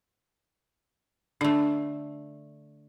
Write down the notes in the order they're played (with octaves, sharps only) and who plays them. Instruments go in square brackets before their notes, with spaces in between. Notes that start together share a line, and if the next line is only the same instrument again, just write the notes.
[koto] D3 A3 [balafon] D4